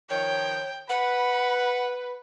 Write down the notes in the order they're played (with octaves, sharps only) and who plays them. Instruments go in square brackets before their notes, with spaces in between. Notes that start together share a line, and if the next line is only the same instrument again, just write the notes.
[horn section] D#3 F3 [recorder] C#5 [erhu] G5
[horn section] B4 [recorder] F#5 [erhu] B5